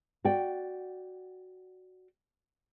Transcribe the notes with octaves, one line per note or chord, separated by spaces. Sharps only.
F#4 D5 G5